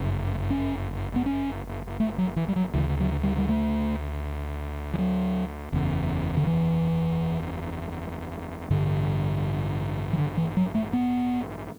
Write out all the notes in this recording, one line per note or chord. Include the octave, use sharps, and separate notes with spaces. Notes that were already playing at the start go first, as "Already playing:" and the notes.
Already playing: G1 F#2 C#3
C#4
B3
C#4
A3
F#3
E3
G3
F#3
D2 C#3 E3
F#3
G3
G3
A3
E3
F#3
F#1 E2 C#3
D3
E3
A1 G2 D3
E3
D3
E3
F#3
A3
B3